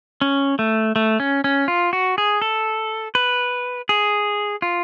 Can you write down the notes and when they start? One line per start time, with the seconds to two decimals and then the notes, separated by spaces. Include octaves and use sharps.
0.21 C#4
0.59 A3
0.96 A3
1.20 C#4
1.44 C#4
1.68 F4
1.93 F#4
2.18 G#4
2.42 A4
3.15 B4
3.89 G#4
4.62 F4